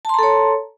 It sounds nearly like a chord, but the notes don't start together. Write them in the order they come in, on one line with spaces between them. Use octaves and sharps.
A5 C6 A#5 A4 C#5